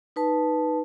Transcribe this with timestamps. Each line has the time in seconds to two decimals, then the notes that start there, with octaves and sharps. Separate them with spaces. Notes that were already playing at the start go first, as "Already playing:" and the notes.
0.16 D#4 B4 A5